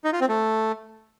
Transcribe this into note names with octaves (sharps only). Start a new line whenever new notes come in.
D#4
F4
C4
A3